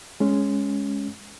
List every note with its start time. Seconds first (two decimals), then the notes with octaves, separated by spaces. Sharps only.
0.20 G#3 C#4